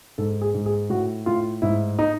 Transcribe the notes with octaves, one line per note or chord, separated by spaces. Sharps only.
G#2 A4
G#4
G#2
G#4
A2 F#4
A2 F4
G#2 E4
D#4